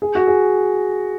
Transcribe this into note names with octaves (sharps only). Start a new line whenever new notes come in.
G#4
F#4
G#4